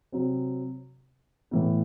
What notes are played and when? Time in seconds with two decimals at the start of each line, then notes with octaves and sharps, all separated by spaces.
0.12 C3 F#3 C4
1.51 A2 E3 B3